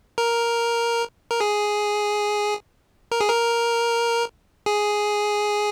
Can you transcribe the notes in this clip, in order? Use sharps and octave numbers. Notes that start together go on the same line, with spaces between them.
A#4
A#4
G#4
A#4
G#4
A#4
G#4